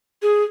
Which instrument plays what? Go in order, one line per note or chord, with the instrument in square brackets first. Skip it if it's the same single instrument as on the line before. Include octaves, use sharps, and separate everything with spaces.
[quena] G#4